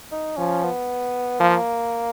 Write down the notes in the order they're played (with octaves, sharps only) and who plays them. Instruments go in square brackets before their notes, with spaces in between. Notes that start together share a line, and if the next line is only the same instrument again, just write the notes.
[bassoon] D#4
[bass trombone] F3 [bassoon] C#4
[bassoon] B3
[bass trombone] F3 [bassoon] A#3